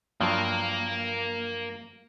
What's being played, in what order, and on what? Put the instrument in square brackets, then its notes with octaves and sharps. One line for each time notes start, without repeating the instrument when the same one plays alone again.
[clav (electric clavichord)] G2 F3 F#3 [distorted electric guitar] A#3